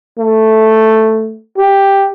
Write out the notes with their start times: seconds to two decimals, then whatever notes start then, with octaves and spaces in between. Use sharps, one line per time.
0.19 A3
1.58 G4